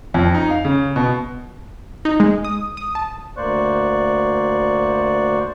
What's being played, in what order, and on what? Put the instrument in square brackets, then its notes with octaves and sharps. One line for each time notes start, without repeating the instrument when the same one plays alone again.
[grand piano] F2
D#4
F5
C#3
B2
[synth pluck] D#4
G#3
D#6
D#6
A5
[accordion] D2 A#3 C5 D5 C#6 F#6